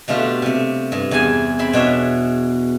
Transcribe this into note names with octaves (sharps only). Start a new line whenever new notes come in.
B2 A3 D4 F4 G4
C3 A3
G2
E2 E4 G#4 G#5 A5
C4 E4 B5 C6
B2 D4 C#5 E5